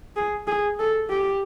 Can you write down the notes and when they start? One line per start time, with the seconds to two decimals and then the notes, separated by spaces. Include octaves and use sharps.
0.16 G#4
0.47 G#4
0.79 A4
1.10 G4